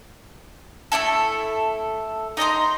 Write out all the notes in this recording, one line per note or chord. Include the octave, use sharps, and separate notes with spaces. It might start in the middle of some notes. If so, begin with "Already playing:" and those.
A3 D#4 E4 A4
D#4 D#5 A#5 C6